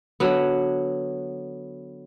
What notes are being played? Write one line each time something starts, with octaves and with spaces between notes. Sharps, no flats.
D3 F#3 B3